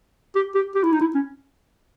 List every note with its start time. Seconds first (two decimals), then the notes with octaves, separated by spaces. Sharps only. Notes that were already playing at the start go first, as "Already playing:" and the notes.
0.36 G4
0.55 G4
0.75 G4
0.83 E4
0.92 D#4
1.01 E4
1.15 C#4